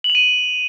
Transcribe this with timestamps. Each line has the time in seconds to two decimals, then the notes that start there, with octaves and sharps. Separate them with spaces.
0.04 F#7
0.10 F7
0.15 D#7